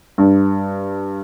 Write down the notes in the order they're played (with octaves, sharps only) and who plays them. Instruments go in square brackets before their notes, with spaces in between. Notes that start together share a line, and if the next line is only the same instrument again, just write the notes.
[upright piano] G2